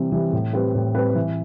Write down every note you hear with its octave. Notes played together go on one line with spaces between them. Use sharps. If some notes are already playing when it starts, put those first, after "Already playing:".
Already playing: C3 E3 G3 C4
E3 G3 C4
A2
G3 C4 G4 B4
A2
G3 C4 G4 B4
E3